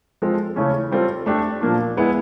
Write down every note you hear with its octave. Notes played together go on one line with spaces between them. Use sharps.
F3 G#3 C4 F4 A4
C#3 E3 A3 C#4
G3 C4 F4 A4
A3 D4 G4
A#2 F3 A#3 D4
G#3 B3 E4 G#4